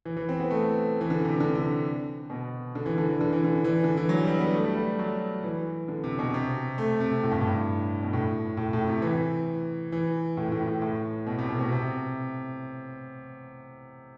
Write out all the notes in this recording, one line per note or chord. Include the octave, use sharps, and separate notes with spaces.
E3
E3
C4
B3
A3
E3
D3
C3
D3
D3
B2
D3
E3
D3
E3
D3
E3
D3
E3
D3
E3
F#3
G3
B3
A3
G3
A3
F#3
E3
D3
C3
B2
C3
A3
C3
A2
G2
A2
B2
A2
A2
A2
C3
E3
E3
A2
A2
A2
A2
B2
C3
B2
B2
C3